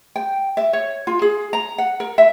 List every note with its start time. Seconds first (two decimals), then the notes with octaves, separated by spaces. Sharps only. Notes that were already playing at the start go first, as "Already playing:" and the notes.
0.16 G5
0.57 E5
0.73 C#5
1.07 F4
1.22 G#4
1.53 A#5
1.78 F#5
2.00 A#4
2.18 E5